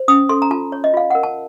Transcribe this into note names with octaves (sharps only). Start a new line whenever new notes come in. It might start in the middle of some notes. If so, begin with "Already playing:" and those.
Already playing: C5
C#4 D#6
A4 C6
A#5
F4 A5
C#5
D#5
F4 F5
A#4 F#5
A5